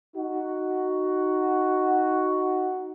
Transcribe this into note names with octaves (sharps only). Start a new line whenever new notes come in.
D#4 F#4